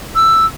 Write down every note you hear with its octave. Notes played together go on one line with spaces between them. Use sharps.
E6